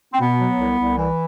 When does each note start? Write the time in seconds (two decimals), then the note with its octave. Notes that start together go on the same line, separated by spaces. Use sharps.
0.13 C4
0.20 B2 B3
0.39 F#3
0.59 C2
0.78 C2
0.98 E3